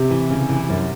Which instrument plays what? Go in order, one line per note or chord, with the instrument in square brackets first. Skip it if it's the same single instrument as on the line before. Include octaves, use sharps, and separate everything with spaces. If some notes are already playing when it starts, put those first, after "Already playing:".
Already playing: [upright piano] C3
[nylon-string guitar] E3
C#3
E3
F#2